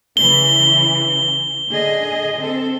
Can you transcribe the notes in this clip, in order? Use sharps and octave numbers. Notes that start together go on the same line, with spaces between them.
C#3 E3 G7
D3 G#4 D#5
C4 A4